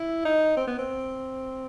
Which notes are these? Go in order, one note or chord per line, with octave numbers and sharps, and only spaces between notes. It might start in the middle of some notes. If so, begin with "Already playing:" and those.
Already playing: E4
D#4
C4
B3
C4